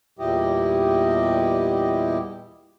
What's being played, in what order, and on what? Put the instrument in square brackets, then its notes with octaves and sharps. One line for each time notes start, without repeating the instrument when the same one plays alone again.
[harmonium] E2 A#2 G3 E4 G4 D#5